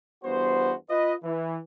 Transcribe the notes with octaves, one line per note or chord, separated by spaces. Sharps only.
E2 G2 B3 F#4 C5
F4 B4 D#5
E3